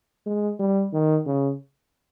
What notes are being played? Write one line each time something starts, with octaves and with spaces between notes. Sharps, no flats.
G#3
G3
D#3
C#3